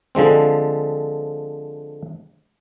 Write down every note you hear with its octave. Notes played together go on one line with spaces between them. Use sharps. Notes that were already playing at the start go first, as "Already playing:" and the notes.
D3 F3 G#3 C4